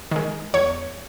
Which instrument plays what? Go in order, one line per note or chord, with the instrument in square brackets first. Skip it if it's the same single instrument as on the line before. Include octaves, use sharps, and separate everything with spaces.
[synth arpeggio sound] D#3 G#3
E2 C#5